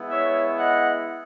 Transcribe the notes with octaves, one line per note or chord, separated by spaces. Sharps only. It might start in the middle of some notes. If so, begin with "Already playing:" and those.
Already playing: G#3 B3 E4
C#5 E5
D#5 F#5